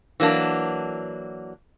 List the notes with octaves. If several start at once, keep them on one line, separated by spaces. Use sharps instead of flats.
E3 F#3 A#3 D4